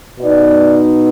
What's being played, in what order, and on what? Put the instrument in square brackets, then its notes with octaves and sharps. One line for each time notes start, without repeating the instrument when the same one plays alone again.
[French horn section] B2 B3 D#4 D5